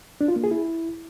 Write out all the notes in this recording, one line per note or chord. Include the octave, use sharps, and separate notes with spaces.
D4
F4
A#3
G#4
E4